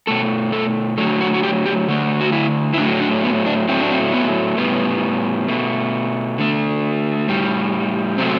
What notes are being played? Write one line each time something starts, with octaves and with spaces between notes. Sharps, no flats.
B2 A3 A4
A4
D3 F#3 A3 A4
F#4
F#4
G4
G4
D3 A3
F#4
E4
E4
A2 F#3 A3 D4
D4
B3
D4
A2 F#3 A3 C4
D4
C4
B3
A2 G3 B3
B2 A3
D3 A3
A2 G3
C3 F#3 A3 C4